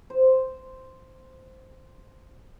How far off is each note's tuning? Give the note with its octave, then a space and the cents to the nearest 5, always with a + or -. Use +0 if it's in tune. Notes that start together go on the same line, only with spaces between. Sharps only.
C5 -5